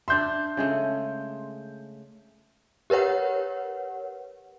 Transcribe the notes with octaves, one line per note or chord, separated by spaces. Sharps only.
D4 C5 E5 C6 G6
C#3 G#3 A3
G4 A#4 B4 C#5 F#5